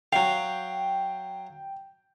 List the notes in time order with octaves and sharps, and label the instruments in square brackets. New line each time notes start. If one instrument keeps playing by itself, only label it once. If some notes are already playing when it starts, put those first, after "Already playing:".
[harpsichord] F#3 F5 [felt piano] G5